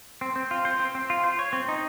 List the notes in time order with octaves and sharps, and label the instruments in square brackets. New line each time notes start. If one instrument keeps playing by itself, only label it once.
[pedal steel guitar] C4
C4
F4
C5
C4
C4
F4
C5
C#5
C4
D#4